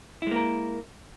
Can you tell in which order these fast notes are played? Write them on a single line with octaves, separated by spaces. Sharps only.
E4 G#3 A#3 A#4